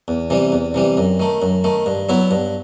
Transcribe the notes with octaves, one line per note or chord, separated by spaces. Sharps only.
E2
C3 E3 G3
E2
C3 E3 G3
F#2
D#3 A3
F#2
D#3 A3
G2
F#3 B3 E4
G2